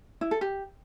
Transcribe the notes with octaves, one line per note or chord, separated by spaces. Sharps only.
E4
A4
G4